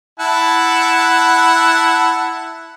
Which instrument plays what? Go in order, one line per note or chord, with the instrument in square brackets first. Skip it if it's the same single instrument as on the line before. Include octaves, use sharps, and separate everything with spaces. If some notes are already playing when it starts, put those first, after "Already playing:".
[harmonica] E4 F#5 A5